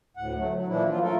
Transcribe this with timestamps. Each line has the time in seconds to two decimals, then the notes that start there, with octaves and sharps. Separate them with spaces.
0.17 D2 A2 F#5
0.37 F#3 A3
0.55 F#3
0.68 A#2 E3 F3 D4 E4
0.88 F3 F#3 F4
1.02 A3 F4 A4 A#4